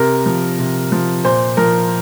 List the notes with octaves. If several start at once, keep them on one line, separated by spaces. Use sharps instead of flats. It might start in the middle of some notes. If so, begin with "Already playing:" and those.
Already playing: C3 A#4
F3
C3
F3
A#2 C5
F3 A#4